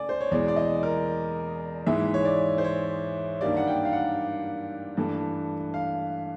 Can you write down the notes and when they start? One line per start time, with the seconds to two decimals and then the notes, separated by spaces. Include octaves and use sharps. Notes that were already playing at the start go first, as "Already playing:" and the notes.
Already playing: C#3 A3 D5 G#5
0.09 C5
0.21 C#5
0.32 E2 B2 G#3 D5
0.48 D5
0.56 D#5
0.83 A#4
1.87 G#2 E3 G#3 E5
2.14 C#5
2.25 D5
2.58 C5
2.64 C#5
3.41 G2 D#3 G3 A#3 D5
3.57 F#5
3.67 G5
3.85 F5
3.93 F#5
4.97 G2 E3 A3
5.74 F5